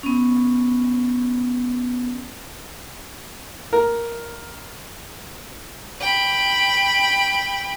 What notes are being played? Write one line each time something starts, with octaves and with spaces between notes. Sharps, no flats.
B3 C#4
A#4
G5 B5